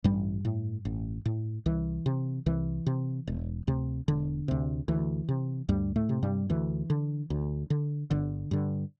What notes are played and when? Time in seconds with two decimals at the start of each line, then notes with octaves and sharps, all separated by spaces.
0.04 A1 G2 G3
0.45 A2
0.85 A1
1.26 A2
1.66 C2 E3
2.06 C3
2.46 C2 E3
2.87 C3
3.27 E1
3.67 D2 C3
4.08 E1 D3
4.48 D2 C3
4.88 D2 E3
5.29 C3
5.69 D2 G2 G3
5.96 A2 A3
6.09 C3
6.23 G2 G3
6.50 D2 E3
6.90 D3
7.30 D2
7.70 D3
8.11 G1 D3
8.51 G2 D3